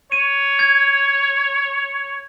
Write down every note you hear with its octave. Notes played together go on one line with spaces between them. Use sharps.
C#5 D#7
G#6